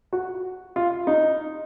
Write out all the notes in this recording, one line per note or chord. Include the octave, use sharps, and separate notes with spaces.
F#4
F4
D#4